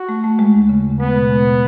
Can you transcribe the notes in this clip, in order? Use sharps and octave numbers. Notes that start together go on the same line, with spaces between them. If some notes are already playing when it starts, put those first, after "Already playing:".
Already playing: F#4
A3
A3
G#3
D#2
C#3
D#2
G#3 B3
B2
G#3
B2